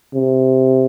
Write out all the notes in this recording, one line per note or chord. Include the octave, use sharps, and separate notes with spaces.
C3